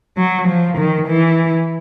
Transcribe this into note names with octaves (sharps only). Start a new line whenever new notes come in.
F#3
F3
D#3
E3